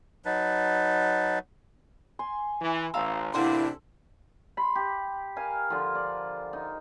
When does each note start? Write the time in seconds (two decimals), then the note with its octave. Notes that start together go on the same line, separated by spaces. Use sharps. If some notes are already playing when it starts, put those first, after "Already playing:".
0.25 F#3 D#4 B4 A5
2.19 G#5 C6
2.61 E3
2.94 A1 F5 A5 A#5 C6 E6
3.34 A1 C3 A#3 D4 E4 A4 F#5 C6
4.57 B5 C6
4.75 G4
5.36 A#4 F5 G#5
5.70 D3 F3
5.95 D5
6.53 D#4